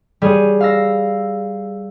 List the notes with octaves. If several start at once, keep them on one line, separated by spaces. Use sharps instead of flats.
G3 G#4 C#5 D#7
F5 E6 A#6